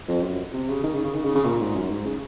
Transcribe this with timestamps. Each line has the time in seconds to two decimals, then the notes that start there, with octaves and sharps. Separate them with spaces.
0.08 F2
0.23 F#2
0.53 C3
0.69 C#3
0.84 D#3
0.94 C#3
1.04 C#3
1.15 D#3
1.25 C#3
1.35 C#3
1.45 A#2
1.60 G#2
1.75 F#2
1.90 G#2
2.06 C#3